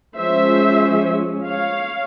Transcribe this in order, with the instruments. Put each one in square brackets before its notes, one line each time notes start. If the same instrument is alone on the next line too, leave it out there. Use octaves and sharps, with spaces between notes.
[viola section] F3 G#3 C#4 C5 E5
C#5 F5